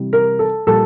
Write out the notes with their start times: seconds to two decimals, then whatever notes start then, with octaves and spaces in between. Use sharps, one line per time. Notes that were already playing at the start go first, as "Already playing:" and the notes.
Already playing: C3 E3 G3
0.13 A#4
0.39 A4
0.67 A#2 G3 A4